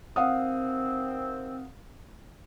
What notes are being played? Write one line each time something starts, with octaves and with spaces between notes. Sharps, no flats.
C3 D#3 C4 F5 F#5 D#6